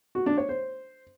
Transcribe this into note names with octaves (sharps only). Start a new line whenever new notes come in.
F#4
D4
C#5
C5